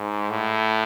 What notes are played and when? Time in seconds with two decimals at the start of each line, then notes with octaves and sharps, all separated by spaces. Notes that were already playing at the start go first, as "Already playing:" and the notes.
Already playing: G#2
0.30 A2